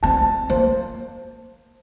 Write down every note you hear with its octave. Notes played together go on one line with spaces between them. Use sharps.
C4 A5
A#3 C5